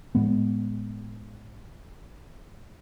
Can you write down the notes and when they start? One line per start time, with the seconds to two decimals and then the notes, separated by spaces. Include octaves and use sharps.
0.15 A2 G#3 B3